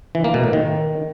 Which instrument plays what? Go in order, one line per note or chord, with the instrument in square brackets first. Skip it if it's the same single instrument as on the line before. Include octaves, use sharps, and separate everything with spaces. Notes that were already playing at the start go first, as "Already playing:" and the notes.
[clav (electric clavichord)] E3
A#3
B2
A2
D#3